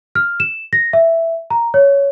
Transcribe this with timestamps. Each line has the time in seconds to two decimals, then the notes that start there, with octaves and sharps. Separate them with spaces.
0.15 F6
0.40 E7
0.73 A#6
0.93 E5
1.50 A#5
1.74 C#5